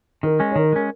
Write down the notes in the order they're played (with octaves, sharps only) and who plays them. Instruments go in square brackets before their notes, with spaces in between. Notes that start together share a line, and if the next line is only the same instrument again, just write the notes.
[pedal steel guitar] D#3 [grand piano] A#4
[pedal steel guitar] G#3 C#4
[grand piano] C#5
[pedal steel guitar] D#3 [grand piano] A#4
[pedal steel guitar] G#3 C#4